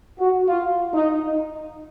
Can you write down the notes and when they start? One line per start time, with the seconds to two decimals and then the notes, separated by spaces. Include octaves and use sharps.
0.19 F#4
0.47 F4
0.92 D#4